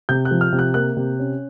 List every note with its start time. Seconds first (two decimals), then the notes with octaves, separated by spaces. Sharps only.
0.09 C3 G6
0.25 F#6
0.31 F3
0.41 F6
0.52 C3
0.59 F#6
0.74 A#3 F#6
0.97 C3
1.19 C#4